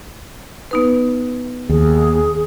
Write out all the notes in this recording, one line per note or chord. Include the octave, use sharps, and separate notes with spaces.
B3 D#4 B4
D#2 G#4